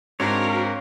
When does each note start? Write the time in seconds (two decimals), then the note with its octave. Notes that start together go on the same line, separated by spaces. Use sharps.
0.20 G#2 C4 D4 F#4 A#4 C#5 F5